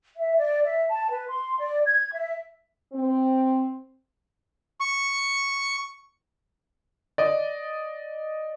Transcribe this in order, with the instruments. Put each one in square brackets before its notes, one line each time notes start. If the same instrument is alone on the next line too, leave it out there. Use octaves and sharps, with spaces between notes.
[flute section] E5
D5
E5
A5
B4
C6
D5
G#6
E5
[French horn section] C4
[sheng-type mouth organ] C#6
[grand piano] D5 D#5